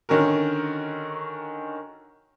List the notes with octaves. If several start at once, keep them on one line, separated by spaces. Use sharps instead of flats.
D3 D#3 C#4 F#4 A#4